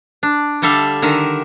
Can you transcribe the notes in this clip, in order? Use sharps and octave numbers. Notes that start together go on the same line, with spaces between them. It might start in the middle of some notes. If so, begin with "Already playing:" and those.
D4
D3 G3 A4 E5 F5
D3 D#3 A#4 E5